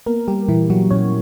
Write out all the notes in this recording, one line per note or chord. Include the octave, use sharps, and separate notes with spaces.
A#3 B3 A#4
G3 G4
A#2 E3 E4
F#3 F#4
A#2 C#4 C#5